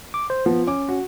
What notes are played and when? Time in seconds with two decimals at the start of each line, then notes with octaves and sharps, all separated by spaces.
0.14 D6
0.30 C5
0.46 F3 B3
0.67 C#4 D6
0.88 F#4